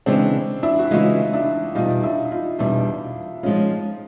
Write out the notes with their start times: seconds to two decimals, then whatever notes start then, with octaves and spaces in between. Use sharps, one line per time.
0.06 C#3 E3 G#3 C4 D4
0.63 D4 E4
0.79 F#4
0.91 C#3 E3 G#3 D#4 F4
1.33 D4 E4
1.75 E2 B2 G3 D#4 F4
2.03 D4 E4
2.31 D#4 F4
2.59 E2 B2 G3 D4 E4
3.43 F3 G#3 C#4 D#4 F4